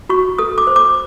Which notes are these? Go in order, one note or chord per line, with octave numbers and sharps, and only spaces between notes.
F#4 C#6
A4 D#6
D6
C5
D6